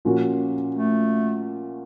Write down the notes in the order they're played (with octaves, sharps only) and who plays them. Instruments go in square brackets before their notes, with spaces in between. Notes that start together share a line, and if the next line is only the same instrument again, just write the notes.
[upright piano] A#2 F3 A#3 C#4 F#4
[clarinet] A3